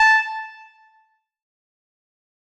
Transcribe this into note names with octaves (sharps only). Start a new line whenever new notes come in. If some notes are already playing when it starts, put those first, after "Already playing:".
Already playing: A5